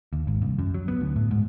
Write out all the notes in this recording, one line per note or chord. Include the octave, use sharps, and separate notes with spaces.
D#2
G#1
C2
F#2
F#3
B3
D2
A2
G#2